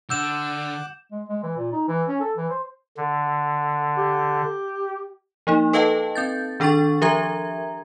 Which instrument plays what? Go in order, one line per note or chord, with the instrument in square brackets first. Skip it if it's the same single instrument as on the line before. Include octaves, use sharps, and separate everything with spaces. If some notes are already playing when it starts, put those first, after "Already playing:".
[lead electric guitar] D3 [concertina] F#5 D6 [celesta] E6 [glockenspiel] G6 E7
[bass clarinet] G#3
G#3
E3
A#2
D#4
E3
C#4
A4
E3
C5
[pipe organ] D3
[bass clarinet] G4
[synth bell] F3 A#3 D#4
A4 B4 D#5 F5 G5 A5
C4 G6 A6
D#3 D4 A4 G5 C#6 A6
F3 G4 A#4 E5 A#5 G#6